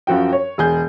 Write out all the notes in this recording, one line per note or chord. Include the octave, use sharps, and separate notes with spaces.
F#2 F3 F#4 G5
C#5
E1 G#4 G6